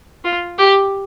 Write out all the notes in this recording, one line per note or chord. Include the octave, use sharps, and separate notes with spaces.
F4
G4